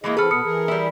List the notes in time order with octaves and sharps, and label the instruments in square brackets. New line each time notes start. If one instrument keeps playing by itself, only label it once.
[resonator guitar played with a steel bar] E3 G#3 A#3 [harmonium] E4 G#4 D#5
[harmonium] E3 C4 [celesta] G#4 F6 [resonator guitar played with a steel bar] A4 B4
[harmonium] B2 B3 [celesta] D#6 F6 C#7
[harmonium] E3 G#4 A#4
[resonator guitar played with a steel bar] G3 E4